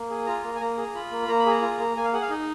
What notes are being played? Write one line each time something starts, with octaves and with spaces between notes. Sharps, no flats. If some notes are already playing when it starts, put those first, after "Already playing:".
Already playing: A#3
G#4
F4 A#5
A#3
G#5
A#3 A#5
G#4
F4 B5
A#3
A#3 A#5
B5
G#4 A#5
F4
A#3
A#3 G#5
F5
G#4 F#5
F5
D#4 D#5